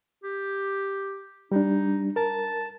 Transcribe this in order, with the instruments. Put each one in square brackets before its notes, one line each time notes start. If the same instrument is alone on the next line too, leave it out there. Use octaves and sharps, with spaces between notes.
[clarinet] G4
[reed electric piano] G3 D4 [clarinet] D#4
[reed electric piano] A#4 [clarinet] A5